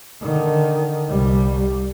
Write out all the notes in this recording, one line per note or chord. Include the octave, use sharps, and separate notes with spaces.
D3 D#3
C2 G3